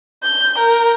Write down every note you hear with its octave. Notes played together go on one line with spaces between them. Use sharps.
G6
A#4